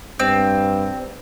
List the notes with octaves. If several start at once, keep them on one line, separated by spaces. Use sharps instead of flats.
G2 C4